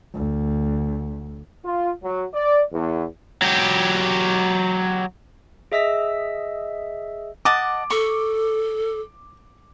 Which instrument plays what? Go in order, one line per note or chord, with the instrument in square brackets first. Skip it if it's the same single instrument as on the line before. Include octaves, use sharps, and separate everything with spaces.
[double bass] D2
[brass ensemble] F4
F#3
D5
E2
[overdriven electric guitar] F#3 G4
[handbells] G#4 D#5 E5 D#6 E6 B6
[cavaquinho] D#5 F#5 A5 [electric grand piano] D6
[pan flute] A4 [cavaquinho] C#6